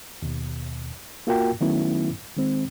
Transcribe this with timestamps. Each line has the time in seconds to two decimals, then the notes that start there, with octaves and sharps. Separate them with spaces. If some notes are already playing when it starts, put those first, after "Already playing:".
0.22 D#2 B2
1.27 A#3 F4 F#4 A#4 G5
1.61 D#3 F#3 A3 B3 C#4 E4
2.36 D#3 G#3 C4